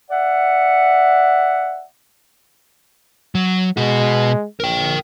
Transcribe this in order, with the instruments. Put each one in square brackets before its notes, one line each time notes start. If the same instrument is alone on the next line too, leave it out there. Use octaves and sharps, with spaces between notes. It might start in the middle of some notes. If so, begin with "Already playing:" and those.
[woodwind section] D5 E5 F#5
[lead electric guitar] F#3
[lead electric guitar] B2 F#4 [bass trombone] G#3
[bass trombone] A#1 [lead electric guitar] A#4 G5